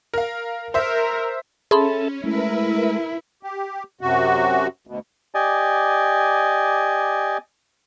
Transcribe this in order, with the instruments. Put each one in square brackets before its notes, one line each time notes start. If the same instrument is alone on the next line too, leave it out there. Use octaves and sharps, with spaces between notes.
[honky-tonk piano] A#4 F5
[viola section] A#4 [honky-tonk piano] C5 E5
[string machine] C#4 [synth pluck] G#4 B5 C6 [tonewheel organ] A4 E5 A5
[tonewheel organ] G#3 A3 [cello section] E4 [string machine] A#4 B4 E5
[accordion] G4
F#2 C3 F#4
D2 B2
[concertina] G4 D5 D#5 G#5